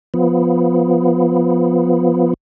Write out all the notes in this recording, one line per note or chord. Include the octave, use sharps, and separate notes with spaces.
F3 B3